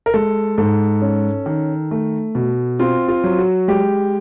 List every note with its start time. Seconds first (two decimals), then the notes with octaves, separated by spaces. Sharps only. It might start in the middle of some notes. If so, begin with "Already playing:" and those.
0.06 A#4
0.14 G#3 A4
0.58 G#2 A4
1.02 C#4
1.46 D#3
1.91 A3
2.35 B2
2.79 C4 F4
3.08 F4
3.24 F#3
3.38 F#4
3.68 G#3 G4